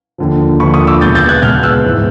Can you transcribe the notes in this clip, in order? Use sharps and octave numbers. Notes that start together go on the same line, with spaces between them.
D#2 D3 F3
D#2 D3 F3 B5 C#6
C#6 D#6
D6 E6
C#2 B2 G6 A6
G6 A6
F#6 G#6
C#2 B2 F6 G6
E6 F#6
G#2 E3